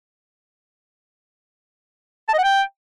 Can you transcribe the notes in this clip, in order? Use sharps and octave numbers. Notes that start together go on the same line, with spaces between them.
A5
D#5
F#5
G5